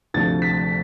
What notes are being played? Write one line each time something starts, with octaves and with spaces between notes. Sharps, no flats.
D2 C3 F3 A3 A6
B6